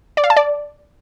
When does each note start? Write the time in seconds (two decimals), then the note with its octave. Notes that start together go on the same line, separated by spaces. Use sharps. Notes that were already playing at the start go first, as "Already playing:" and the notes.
0.17 D5
0.24 F5
0.30 A5
0.37 D5